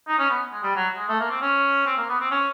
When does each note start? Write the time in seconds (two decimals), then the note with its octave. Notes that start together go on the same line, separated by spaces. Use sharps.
0.08 D#4
0.19 C#4
0.30 B3
0.52 G#3
0.63 G3
0.75 F#3
0.97 G#3
1.09 A3
1.20 A#3
1.30 C4
1.42 C#4
1.86 C4
1.97 A#3
2.09 B3
2.20 C4
2.31 C#4